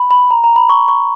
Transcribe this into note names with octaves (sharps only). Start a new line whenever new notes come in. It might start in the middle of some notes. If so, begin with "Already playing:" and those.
Already playing: B5
B5
A#5
A#5
B5
C#6
C#6